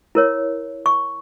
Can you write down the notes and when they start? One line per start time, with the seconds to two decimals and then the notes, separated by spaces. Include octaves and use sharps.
0.15 E4 A#4 C#5
0.86 C#6